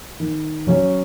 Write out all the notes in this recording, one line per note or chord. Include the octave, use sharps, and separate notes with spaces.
D#3
F#3 C#4 F#4 C#5